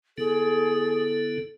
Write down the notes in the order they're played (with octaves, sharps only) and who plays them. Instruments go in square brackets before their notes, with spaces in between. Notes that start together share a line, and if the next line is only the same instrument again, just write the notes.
[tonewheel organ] D3 B3 E4 [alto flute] G#4 [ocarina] A4